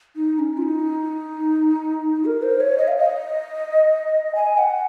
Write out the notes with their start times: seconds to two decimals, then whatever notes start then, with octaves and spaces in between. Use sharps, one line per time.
0.16 D#4
0.39 C#4
0.57 F4
0.62 D#4
2.25 A#4
2.42 C5
2.60 C#5
2.78 D#5
2.88 F5
2.97 D#5
4.35 G#5
4.58 F#5